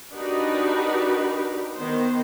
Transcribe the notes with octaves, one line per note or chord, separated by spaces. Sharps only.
D4 D#4 F#4 G4 A#4 B4
D#3 B3 C5